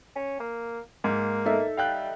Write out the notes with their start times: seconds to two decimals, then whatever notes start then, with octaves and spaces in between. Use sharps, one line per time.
0.15 C#4
0.40 A#3
1.04 G#2 A#3
1.45 D#4 A4 E5
1.77 G3 F5 G5 F#6